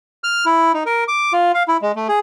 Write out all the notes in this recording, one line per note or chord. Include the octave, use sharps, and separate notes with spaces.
F6
E4
D#4
A#4
D6
F4
F5
E4
G#3
A3
G#4